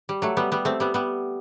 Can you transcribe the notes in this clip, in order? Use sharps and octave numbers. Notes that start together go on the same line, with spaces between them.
G3
F#3 A3
G3 B3
G3 B3
A3 C4
G3 B3
G3 B3